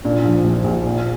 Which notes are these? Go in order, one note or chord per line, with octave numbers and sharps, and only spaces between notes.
A#2 D4
F3
A#1
A#1
A#2